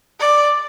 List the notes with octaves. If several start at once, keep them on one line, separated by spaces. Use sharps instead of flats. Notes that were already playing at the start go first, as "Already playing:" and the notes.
D5